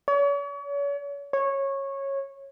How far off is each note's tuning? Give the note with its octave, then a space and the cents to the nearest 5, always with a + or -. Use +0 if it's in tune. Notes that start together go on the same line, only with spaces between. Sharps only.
C#5 +40
C#5 -15